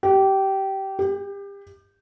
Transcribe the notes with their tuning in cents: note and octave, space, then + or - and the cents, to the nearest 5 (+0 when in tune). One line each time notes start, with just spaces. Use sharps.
G4 -20
G4 +30